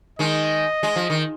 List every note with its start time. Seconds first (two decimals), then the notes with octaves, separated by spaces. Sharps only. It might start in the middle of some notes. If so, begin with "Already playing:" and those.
0.19 D#3 G#3 D#5
0.83 G#3
0.96 F3
1.10 D#3